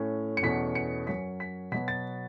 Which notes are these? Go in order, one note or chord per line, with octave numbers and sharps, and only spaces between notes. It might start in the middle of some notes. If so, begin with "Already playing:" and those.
Already playing: A2 A3 C#4
C#7
E2 B2 A3 C#4 B6
C#7
F#2 F#3 C#4 B6
B6
B2 F#3 B3 B6
A6